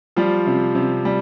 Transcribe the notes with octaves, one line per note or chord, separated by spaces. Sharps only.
F3 G3 F4
C3
C3
G3